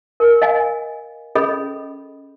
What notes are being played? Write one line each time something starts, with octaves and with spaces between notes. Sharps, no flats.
A#4
D#5 F5 G#5
C#4 G#4 A4 D#5 B5